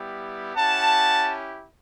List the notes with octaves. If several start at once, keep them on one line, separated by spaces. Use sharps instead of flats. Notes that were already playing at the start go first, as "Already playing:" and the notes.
Already playing: G3 B3 E4 G4
C#4 E4 G4 F#5 A5